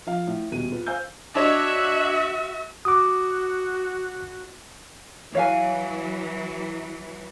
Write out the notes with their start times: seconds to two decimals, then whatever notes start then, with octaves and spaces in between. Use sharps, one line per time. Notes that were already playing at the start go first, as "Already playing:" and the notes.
0.07 F3 F5
0.27 A2
0.51 D#1 B2 D#7
0.72 F4 B4
0.86 C5 F5 G#5 E6 G6
1.35 D4 F#4 C#5 D#5 E5
2.85 F#4 D6 D#6
5.35 E3 F#3 C#5 F5 G#5